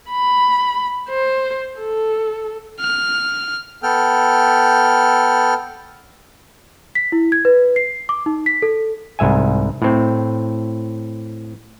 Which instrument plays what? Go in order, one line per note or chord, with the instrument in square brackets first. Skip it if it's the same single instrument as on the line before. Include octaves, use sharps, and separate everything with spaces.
[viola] B5
C5
A4
[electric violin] F6
[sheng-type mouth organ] B3 A4 G5 F6
[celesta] B6
E4
G#6
B4
C7
D6
D#4
B6
A4
[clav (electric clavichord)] C2 G#2 E5 G#5
A2 C4